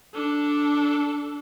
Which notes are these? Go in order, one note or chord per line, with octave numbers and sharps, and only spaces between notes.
D4 A4